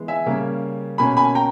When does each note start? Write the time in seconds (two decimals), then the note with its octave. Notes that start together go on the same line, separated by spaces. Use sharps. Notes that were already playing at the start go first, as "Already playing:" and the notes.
Already playing: E3 G#3 B3
0.08 E5 G#5
0.26 C#3 G3 A#3 C#4
0.98 B2 A#3 C#4 G#5 B5
1.17 G#5 B5
1.35 G5 A#5